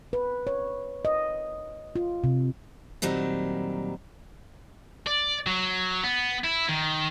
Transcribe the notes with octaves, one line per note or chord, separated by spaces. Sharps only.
B4
C#5
D#5
F4
C3
A#2 D#3 F#3 G3 C4
D5
F#3
B3
E4
D#3